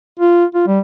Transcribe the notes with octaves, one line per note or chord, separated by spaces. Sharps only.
F4
F4
G3